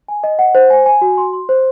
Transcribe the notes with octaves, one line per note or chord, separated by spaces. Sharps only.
G#5
D#5
F#5
C5
G#5
G#5
F#4
C6
C6
C5